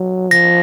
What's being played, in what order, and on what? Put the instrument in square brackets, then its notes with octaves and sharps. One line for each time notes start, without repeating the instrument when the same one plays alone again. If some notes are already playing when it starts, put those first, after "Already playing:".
Already playing: [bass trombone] F#3
[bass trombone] F3 [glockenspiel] A#6